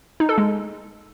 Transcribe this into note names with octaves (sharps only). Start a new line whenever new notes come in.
D#4
A4
G#3